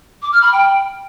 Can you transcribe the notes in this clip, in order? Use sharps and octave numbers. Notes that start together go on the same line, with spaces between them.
D6
F6
B5
G5